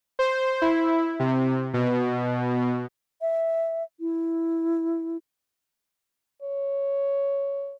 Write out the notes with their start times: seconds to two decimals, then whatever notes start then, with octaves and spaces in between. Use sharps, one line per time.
0.19 C5
0.62 E4
1.20 C3
1.74 B2
3.22 E5
4.00 E4
6.43 C#5